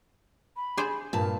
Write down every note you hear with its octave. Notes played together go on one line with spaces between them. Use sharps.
B5
G#4 C5 D5
G2 A#2 A#4 A5